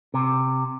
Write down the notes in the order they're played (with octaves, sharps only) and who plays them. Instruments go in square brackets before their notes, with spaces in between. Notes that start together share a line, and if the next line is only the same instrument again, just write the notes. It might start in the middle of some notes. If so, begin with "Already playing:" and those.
[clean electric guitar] C3